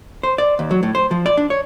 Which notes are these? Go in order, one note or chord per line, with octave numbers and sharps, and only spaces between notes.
C5
D5
D#2
F#3
A2
C5
F3
D5
D4
C#5